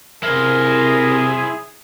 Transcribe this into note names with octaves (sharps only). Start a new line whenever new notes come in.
C3 E4 G#4 A#4 C5